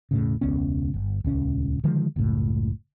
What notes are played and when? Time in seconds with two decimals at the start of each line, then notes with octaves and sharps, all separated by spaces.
0.11 E1 A2 C#3
0.41 E1 C#2 B3 C#4
0.94 G1
1.24 D#1 C#2 C#4
1.84 D3 D#3 F3 G#3
2.16 F#1 C#2 A2